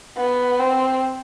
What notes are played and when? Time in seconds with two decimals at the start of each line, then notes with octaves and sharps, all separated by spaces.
0.17 B3
0.60 C4